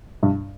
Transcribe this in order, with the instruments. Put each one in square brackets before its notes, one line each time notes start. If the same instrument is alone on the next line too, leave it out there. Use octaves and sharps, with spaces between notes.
[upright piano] G2